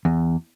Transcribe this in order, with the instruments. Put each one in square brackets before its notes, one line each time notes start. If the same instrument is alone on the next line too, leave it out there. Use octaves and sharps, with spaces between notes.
[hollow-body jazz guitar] E2